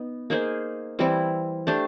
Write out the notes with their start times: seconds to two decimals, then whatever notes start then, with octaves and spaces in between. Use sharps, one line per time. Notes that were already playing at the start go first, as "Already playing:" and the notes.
Already playing: B3 D#4
0.30 A#3 D#4 G#4 C5
0.99 E3 G3 C4 E4
1.67 A3 D4 G4 C5